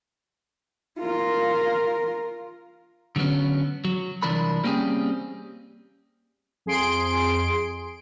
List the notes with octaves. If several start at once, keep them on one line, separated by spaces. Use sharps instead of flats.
F4 A#4
D3 F#3 G#3 B3 C#4
F#3
C2 E3 F3 D4 A#4 B5
G3 A#3 C4 C#4 G4 G#4
F2 G#4 C6 D7